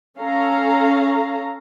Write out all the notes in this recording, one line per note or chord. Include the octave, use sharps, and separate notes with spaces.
C#4 A4 F5 A#5